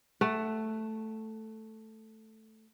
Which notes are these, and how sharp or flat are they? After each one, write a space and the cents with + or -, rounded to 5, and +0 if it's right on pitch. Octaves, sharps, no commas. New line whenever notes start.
A3 +0 F#5 +25